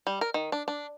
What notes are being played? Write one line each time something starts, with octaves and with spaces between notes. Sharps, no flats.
G3
A#4
D#3
D4
D4